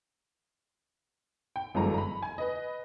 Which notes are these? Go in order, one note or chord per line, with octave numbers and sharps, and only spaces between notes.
G5
G1 F#2 E3 G#3 A4 A#5
A#5 B5
G#5
B4 D#5